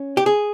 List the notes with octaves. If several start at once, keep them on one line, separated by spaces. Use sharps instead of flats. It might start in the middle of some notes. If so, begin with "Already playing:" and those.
Already playing: C#4
G4
G#4